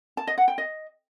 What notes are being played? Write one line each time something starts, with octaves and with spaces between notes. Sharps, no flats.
A5
D#5
F#5
G5
D#5